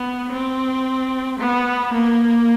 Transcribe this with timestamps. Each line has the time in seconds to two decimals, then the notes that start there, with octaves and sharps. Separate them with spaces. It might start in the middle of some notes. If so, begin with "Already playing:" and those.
Already playing: B3
0.32 C4
1.39 B3
1.94 A#3